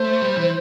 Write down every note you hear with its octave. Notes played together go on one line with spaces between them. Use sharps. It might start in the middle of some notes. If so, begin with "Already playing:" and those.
Already playing: A3 C5
G3
E3